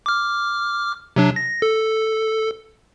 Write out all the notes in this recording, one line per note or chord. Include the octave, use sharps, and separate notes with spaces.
D6 F6
C3 F#3 D4
A#6
A4